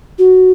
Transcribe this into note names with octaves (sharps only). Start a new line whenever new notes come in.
F#4